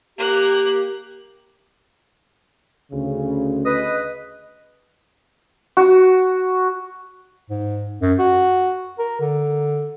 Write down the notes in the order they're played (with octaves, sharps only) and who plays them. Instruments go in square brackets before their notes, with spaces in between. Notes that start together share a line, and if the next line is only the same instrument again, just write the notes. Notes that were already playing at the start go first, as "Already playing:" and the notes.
[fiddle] A#3 F#6 [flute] G4
[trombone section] D2 C#3
[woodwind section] B4 D#5
[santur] F#4
[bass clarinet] G#2
F#2
F#4
A#4
D3